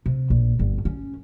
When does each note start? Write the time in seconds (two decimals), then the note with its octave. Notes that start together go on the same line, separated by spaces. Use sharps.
0.06 C3
0.30 A#1
0.59 G1
0.85 C#4